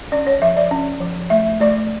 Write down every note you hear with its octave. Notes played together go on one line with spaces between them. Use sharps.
C#4 D5
C#5
F3 E5
D5
C#4
F3
A3 E5
A3 D5